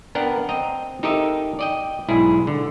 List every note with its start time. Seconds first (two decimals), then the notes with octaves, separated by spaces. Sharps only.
0.15 B3 D4 A#4 F#5 G5
0.49 C4 D#5 G5 A#5
1.03 D#4 G4 A4 A#4 D#5 E5
1.59 D5 D#5 G5
2.08 B1 G#2 E4 G#4
2.47 D3